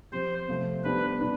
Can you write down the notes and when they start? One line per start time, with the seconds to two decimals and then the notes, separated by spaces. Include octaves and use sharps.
0.12 F3 C4 G4 C5
0.48 C3 F3 A3 C4
0.84 G3 B3 D4 G4 B4
1.21 D4